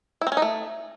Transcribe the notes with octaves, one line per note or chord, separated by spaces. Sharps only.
E4
C4
C#4
D#4
A3